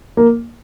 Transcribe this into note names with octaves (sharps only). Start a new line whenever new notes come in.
A#3